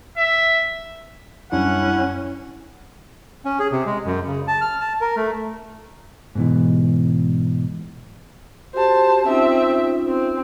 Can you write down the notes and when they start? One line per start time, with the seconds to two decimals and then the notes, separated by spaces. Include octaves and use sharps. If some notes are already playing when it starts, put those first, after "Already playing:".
0.17 E5
1.52 F#2 G3 C#4 D4 E4 F#5
3.45 C#4
3.59 G#4
3.72 C3
3.86 G#3
4.06 F#2
4.27 C#3
4.48 A5
4.61 F6
4.80 A5
5.01 A#4
5.16 A3
6.35 G#2 B2 E3
8.74 F#4 G4 C5 A5
9.26 C4 C#4 D#4 F4 E5
10.08 C4